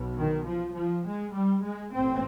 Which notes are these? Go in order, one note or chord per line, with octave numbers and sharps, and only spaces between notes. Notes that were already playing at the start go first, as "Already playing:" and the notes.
Already playing: B1 B2
D#3
F3
F3
G#3
G3
G#3
A1 A2 C4